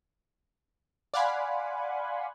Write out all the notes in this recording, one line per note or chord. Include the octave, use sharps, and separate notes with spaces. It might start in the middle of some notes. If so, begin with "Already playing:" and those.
D5 F5 F#5 G#5 B5 C6